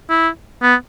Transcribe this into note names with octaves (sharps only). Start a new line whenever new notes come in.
E4
B3